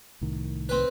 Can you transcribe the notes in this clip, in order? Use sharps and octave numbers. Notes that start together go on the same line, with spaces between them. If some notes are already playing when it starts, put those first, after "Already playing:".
C2 A2 D#3
C4 B4